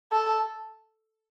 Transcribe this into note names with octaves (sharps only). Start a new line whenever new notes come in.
A4